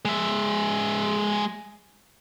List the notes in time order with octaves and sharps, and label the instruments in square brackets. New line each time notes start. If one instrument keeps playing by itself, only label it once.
[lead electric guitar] G#3 E5